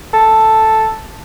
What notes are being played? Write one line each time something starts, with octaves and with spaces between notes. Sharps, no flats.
A4